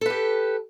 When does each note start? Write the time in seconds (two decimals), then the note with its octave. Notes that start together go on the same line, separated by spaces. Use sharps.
0.01 A4
0.06 B4
0.10 G4